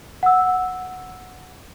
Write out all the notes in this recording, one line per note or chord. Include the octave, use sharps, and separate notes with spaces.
F#5 E6